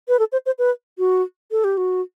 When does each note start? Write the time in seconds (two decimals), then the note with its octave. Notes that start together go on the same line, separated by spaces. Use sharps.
0.08 B4
0.19 A4
0.32 C5
0.46 C5
0.59 B4
0.98 F#4
1.51 A4
1.64 G4
1.77 F#4